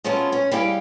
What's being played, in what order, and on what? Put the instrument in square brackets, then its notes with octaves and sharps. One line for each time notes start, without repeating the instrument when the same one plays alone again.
[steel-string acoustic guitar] F#3 G#3 A3 B3 C#4 F4
C#4 C#5
G3 G#3 E4 G4 F5 G5